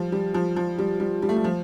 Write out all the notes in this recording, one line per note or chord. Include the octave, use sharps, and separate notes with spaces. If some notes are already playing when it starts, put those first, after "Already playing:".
Already playing: F3 G3
G3
F3
F3
G3
G3
G3
A3
G3
F3